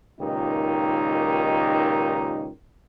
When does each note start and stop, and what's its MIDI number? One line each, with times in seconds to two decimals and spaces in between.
0.19 2.48 37
0.19 2.48 46
0.19 2.48 51
0.19 2.48 63
0.19 2.48 67